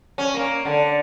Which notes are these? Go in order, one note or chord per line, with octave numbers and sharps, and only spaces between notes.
C#4
A#3
D3